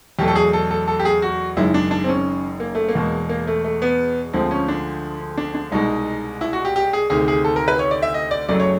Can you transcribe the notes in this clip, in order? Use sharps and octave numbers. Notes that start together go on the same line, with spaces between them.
E2 B2 F#3 A3 G4
A4
G#4
A4
A4
A4
G4
G#4
F#4
F#1 F#2 D#3 G#3 E4
D4
D4
C4
C#4
A#3
A3
A#3
E2 B2 G#3
A#3
A3
A3
B3
D2 D3 F3 G#3 C4
C#4
D4
D4
D4
C2 B2 G#3 D#4
E4
F#4
G4
G4
G#4
D2 C3 D#3 G#4
G#4
A4
A#4
B4
C#5
D5
E5
D#5
D5
F#1 F#2 C#3 F#3 A3 D5
C#5